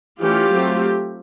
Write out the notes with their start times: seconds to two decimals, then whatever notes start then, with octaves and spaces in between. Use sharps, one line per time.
0.20 E3 A3 C#4 F4 G4
0.50 F#3 A3 C4